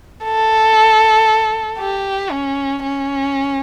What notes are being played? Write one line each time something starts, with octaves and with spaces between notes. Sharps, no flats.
A4
G4
C#4
C#4